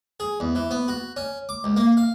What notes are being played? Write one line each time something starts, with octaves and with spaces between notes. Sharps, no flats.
G#4
E2
E3
B3
F#4
C#4
D6
C#2
A#3
F5